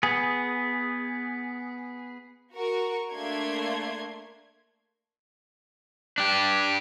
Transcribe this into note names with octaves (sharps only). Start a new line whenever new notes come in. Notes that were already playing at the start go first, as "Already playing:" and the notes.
B3 G#4
F#4 A#4 C#6
A3 A#3 D4 C6 G#6
D4 G4